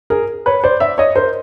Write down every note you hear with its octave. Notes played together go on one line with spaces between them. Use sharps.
G#4 A#4
B4 C#5
C5 D5
D5 E5
C#5 D#5
A#4 C5